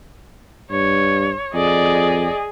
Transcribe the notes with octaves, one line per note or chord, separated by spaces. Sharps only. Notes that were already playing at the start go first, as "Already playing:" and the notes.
G2 C#5
F2 G#4 D5 D#5